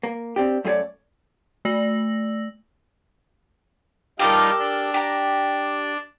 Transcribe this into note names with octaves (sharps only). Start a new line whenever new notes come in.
A#3
C4 D4 G4
F#2 A3 G#4 C#5 D5
A3 D5 E6 A#6 F#7
G3 D#4 F4 G4 A4 A#4
D4
G4 A#5